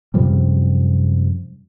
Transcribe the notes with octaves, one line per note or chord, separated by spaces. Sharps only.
F#2 C3 F3 G3